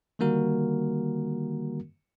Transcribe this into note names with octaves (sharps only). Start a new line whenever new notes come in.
D3 D#3 G3 A#3 F#4 A#4